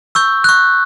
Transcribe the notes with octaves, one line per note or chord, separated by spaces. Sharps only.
C#6 E6 G6
C#6 F#6